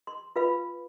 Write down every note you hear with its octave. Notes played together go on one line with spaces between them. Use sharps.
C6
F4 B4 F5 B5